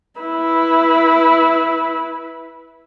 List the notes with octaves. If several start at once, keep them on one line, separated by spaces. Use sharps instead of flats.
E4 B4